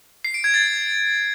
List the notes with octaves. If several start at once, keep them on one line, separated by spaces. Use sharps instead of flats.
C7
D7
G#6
A6